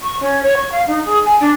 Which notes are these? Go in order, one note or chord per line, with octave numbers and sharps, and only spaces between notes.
C#6
C#4
C#5
C#6
F5
D#4
G#4
G#5
D4